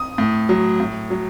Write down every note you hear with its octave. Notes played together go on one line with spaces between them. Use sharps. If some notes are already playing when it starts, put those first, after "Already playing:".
Already playing: D#6
A2
F#3
A2
F#3